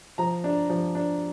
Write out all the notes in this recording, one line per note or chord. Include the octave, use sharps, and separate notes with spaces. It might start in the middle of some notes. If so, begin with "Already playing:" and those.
F3 A#5
D4
F3
D4